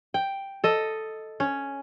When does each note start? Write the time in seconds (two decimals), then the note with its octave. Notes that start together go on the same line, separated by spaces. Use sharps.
0.14 G5
0.64 A4 D#5
1.40 C#4